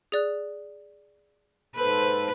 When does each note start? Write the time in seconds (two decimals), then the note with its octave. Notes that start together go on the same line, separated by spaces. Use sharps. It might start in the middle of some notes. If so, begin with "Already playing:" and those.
0.12 G#4 D5 F#6
1.75 G#2 A4 B4 C5